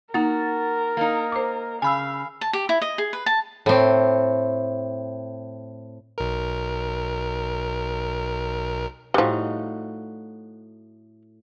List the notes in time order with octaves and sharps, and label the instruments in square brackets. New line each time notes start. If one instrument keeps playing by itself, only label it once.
[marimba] A#3 D#4 [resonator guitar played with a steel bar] F#4 [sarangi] A#4 [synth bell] A6
[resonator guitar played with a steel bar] A#3 D#4
[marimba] C5 D6
[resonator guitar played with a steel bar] C#3 [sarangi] F5 [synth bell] G#5 B5 E6
[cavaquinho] A5
G4
E4
D#5
G#4
B4
A5
[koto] A2 C4
[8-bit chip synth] B1 A#4
[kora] A2 D#4 F#4 [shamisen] F3 G3